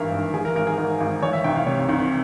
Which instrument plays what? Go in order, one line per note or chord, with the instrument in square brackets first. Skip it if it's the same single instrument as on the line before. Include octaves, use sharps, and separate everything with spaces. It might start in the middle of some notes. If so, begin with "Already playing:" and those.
Already playing: [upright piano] G#1 G2 E3 A#4 E5 F5
G#1
E3 G#4
A#4
G#1 A#4
G#4
G#2 A#4
G#1
E3 C#5
E5
C2 G5
F5
C3 C#5
C2